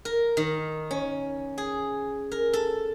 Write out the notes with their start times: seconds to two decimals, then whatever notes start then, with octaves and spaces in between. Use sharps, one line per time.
0.05 A#4
0.37 D#3
0.91 C#4
1.58 G#4
2.32 A#4
2.53 A4